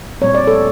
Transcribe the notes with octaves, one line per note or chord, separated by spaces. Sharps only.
A#2 G3 C4 C#5
D5
A4